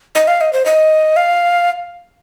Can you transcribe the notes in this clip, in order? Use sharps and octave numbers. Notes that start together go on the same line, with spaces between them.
D#5
F5
D#5
C5
D#5
F5